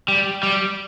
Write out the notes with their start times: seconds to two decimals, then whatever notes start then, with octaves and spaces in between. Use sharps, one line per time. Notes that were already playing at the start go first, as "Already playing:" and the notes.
0.08 G3
0.43 G3